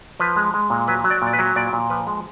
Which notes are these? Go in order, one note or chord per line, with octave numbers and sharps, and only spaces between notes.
F3 B4
G#3
G#3
A#2
F#3 B4
F#3
D5
A#2 D5
B4
F#3
A#2 D5
A#2
F3 B4
G#3